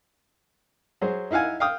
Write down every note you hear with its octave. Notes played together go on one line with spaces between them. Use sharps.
F#3 G#4 C5
D#4 E4 F5 F#5 G#5
F5 G5 D#6